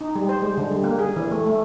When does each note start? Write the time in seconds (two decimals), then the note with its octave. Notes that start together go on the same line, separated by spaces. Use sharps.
0.01 D#4
0.15 G3
0.29 C5
0.42 G#3
0.58 D3
0.71 G3
0.84 A#3
0.99 G#4
1.16 E3
1.31 A3
1.46 A3